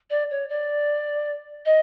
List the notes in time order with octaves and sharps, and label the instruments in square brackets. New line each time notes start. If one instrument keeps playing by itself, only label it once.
[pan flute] D5
C#5
D5
D#5